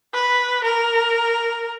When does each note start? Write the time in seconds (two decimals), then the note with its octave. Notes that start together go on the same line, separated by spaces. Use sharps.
0.14 B4
0.64 A#4